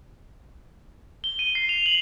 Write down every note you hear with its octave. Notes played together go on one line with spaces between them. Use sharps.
G7
D#7
C7
F7
F#7